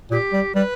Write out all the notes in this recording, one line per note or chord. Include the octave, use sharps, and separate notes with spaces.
A#2 G4
G3
G3 B4